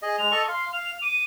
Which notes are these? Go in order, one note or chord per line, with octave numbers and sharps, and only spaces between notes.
G#4 D#5
G#3 F7
A4 D#5 C#6
F5 C6
F5 F7
D6 D#7